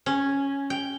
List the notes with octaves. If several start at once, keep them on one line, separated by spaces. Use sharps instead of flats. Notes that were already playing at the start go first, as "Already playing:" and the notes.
C#4
G5